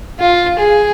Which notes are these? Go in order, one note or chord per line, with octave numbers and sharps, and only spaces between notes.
F4
G#4